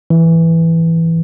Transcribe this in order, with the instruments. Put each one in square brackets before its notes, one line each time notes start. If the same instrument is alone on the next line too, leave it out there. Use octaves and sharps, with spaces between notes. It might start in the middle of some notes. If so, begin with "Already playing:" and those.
[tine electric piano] E3